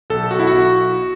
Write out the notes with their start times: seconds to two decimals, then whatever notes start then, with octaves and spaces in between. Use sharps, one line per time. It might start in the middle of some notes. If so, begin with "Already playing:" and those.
0.10 B1 A4
0.31 F#4
0.40 E4
0.47 F#4
0.53 B1